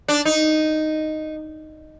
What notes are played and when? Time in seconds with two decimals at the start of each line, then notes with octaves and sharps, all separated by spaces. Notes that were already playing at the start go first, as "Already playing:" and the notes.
0.08 D4
0.25 D#4